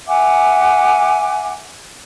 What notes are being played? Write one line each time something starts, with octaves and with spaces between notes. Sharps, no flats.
E5 F#5 G#5 D6